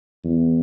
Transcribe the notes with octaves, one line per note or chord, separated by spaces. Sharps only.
E2